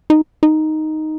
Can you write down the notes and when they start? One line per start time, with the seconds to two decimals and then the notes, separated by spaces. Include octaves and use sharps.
0.10 D#4
0.43 D#4